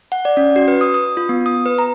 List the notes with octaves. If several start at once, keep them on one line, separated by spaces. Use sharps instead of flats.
F#5
D5
C#4
F#4
B4
D#6
D#6
F4
B3
D#6
B4
A#5